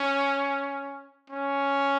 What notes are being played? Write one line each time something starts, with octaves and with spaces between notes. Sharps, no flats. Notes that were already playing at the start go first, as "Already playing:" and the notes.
Already playing: C#4
C#4